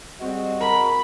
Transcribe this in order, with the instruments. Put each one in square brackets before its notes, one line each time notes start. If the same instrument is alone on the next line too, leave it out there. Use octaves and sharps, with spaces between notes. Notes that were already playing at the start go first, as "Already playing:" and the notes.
[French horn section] G3 G#4 D#5 [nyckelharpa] C4 [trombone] F#4
[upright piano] A#4 [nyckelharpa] B5